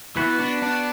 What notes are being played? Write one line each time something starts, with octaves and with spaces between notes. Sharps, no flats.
E3 B3 F#4 B4
D4
D4